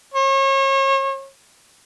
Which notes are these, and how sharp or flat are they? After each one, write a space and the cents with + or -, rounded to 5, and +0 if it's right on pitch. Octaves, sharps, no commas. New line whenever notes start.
C#5 -35